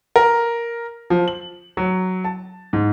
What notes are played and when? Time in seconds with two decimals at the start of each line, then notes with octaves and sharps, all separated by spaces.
0.16 A#4
1.10 F3
1.28 F#7
1.77 F#3
2.25 A5
2.73 G#2